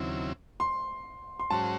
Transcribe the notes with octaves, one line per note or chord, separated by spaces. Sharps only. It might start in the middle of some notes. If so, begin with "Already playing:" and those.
Already playing: D#2 C#3 F#3 C4 E4
C6
C6
G#2 F#3 C#4 F#4 C5 A5